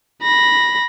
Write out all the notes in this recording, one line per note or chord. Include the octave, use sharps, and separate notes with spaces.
B5 A#6